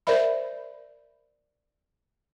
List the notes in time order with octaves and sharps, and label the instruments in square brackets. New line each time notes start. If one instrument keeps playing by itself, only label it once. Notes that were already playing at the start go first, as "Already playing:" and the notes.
[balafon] A#4 C5 D5 E5 B5